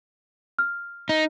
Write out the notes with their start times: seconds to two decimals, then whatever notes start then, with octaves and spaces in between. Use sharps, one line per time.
0.59 F6
1.09 D#4